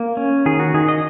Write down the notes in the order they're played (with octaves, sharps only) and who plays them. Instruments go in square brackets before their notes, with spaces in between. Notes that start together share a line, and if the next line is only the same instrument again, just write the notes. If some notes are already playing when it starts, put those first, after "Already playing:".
Already playing: [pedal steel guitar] A#3
C#4
D#3 G#4
F#4
D#3 G#4
D#5